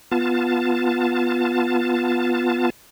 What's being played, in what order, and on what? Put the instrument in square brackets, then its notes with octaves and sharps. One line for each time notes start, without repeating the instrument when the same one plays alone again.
[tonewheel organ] B3 F4 A5